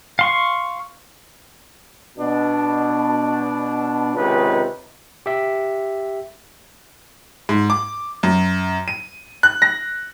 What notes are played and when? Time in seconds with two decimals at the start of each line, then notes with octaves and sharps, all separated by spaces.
0.19 F5 C6 C#6
2.19 B2 D4
4.16 C#2 C3 D#3 C#4 D#4 B4
5.26 G4 E5
7.49 G#2
7.70 D6
8.23 F#2
8.88 D#7
9.43 F#6
9.62 A#6